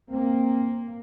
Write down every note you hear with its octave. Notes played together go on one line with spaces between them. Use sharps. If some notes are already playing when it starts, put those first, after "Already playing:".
A#3 C4